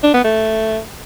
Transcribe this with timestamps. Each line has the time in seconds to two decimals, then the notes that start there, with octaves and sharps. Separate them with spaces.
0.03 D4
0.14 B3
0.24 A3